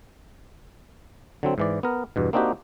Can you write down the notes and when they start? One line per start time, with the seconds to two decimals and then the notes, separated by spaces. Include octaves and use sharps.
1.43 D3 F#3 C4
1.58 G#2 E3 D5
1.83 B3 A#4
2.16 E2 G2 B2
2.33 A#3 C4 D4 D#4 F#4 G4